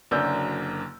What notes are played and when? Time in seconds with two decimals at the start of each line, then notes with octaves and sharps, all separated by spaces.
0.11 F#1 F#2 D3 D5 E6 G6